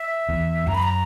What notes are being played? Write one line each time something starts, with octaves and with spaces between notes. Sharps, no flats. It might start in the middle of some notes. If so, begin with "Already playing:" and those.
Already playing: E5
E2
F#2 A#5
B5
A#5